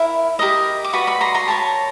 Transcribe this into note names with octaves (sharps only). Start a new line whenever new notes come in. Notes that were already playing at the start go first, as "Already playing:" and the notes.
Already playing: E4 A#4
G4 A#4 D#5
D6
F#4 B4 D5 B5 C#6
B5 C#6
A#5 C6
A#5 C6
G4 A#4 C#5 A5 B5